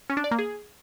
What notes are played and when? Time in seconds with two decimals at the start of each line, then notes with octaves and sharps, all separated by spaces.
0.10 C#4
0.17 D4
0.24 D5
0.31 A#3
0.39 G#4